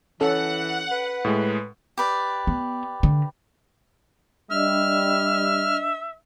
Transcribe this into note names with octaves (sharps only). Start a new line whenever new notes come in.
E3 C#4 A4 F#5
B4
A2 G#3
G4 B4 D5
B3
D3
G3 D4 D#5 E5 F6